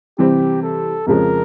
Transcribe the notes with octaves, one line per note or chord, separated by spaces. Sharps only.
C3 E3 G3 C4 G4
A4
F2 C#3 F3 G#3 C#4 A#4